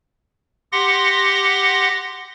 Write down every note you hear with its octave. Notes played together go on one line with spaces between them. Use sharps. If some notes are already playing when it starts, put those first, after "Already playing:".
G4 F#5 C6 A#6